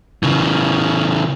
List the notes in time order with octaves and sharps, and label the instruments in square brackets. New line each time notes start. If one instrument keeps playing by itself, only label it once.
[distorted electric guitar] C#3 E3